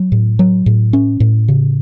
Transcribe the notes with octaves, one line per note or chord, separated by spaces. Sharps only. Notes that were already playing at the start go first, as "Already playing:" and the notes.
Already playing: F#3
A2
F#3
A2
C#4
A2
C#3